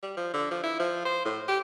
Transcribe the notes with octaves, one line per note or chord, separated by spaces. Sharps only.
G3
F3
D3
F3
E4
F3
C5
A2
G4